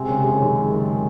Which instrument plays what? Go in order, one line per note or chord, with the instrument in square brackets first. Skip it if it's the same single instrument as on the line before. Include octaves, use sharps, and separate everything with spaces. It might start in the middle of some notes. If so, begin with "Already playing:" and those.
Already playing: [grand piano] C3 [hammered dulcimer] G#3 C4 F#4
[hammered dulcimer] F#2 [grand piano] C#3
[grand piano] C#3 [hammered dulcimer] F3
[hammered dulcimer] F#2 [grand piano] D#3
[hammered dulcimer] G#3
F#2
F3